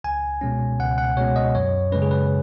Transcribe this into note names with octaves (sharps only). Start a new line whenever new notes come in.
C#2 G#5
B2 G#3 C#4
C#2 F#5
F#5
B2 G#3 C#4 C#5
D#5
F#2 C#5
C#3 G#3 C#4 B4
G#4
B4